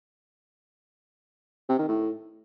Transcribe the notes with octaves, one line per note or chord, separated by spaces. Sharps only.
C3
D#3
A2